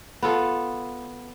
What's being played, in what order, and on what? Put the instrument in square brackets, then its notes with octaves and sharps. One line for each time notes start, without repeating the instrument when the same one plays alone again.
[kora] B3 F4 A4